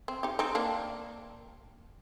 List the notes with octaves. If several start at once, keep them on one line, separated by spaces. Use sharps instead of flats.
C4
D#4 G4
C4 D#4
A#3 D4